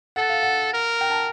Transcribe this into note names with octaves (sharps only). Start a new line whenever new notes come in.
A4 F#5
F5
F#5
A#4
G5
A5